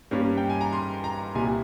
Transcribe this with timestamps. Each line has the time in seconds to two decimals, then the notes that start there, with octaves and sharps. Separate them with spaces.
0.11 G2 G3 A#3 C#4
0.37 G5
0.49 G#5
0.61 A#5
0.72 C6
1.04 A#5
1.35 C2 A#2 G3 G#5